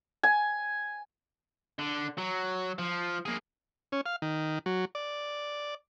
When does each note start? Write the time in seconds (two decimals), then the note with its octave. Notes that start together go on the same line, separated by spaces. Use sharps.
0.23 G#5
1.79 D3
2.18 F#3
2.79 F3
3.26 A#3 G#4
3.92 C#4
4.06 F5
4.22 D#3
4.66 F#3
4.95 D5